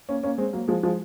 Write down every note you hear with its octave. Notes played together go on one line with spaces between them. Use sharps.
A#3 C#4
A#3 C#4
G#3 C4
F#3 A#3
F3 G#3
F3 G#3